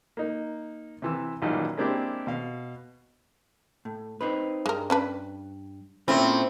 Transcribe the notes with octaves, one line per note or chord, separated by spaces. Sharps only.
A#3 D#4
C3 E3 E6
A1 A#2 D#3 F#3 G3 D#4
G#3 A#3 C4 D4 E4 G4
B2 F5
A2
C4 D#4 B4
G2 G#3 A#4
C#4 D4 B4
A#2 A3 C4 C#4 E4 G#4